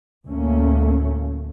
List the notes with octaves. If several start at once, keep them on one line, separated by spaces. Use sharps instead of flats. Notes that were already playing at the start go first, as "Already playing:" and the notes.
D2 A2 A3 A#3 C#4